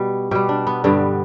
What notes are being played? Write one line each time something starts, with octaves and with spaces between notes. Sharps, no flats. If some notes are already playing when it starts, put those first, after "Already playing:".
Already playing: B2 G3
B2 G3 G4
D4
B3
G2 D3 G3 B3